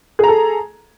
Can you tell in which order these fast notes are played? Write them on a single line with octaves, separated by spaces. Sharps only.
G#4 A#5 A4